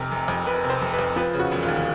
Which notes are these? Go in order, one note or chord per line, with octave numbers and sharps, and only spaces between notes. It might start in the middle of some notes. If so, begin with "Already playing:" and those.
Already playing: F1 C3 A#4
F1
F2
F1 B4
C3
C5
F1
B4
F2
F3 B4
C#3
F#4
E1
F4
D#2